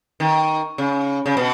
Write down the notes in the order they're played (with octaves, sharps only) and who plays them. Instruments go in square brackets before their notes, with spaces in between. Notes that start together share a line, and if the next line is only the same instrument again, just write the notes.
[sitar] D#3
C#3
C#3
B2